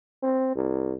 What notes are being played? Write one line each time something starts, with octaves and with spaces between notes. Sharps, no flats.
C4
C2